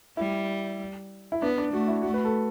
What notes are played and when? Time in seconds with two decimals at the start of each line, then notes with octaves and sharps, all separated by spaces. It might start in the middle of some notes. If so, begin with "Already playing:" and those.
0.17 G3 E4
1.32 E4
1.42 B3 D4
1.58 D4
1.73 A3 F#4
1.88 E4
2.02 A3 F#4
2.14 B4
2.25 A4